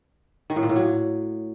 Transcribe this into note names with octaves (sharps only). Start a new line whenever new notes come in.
D#3
A2
A#2
A2
F#3